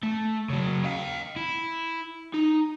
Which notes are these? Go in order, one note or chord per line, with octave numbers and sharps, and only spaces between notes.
A3
C#3 F#3
D#5 F5
E4
D#4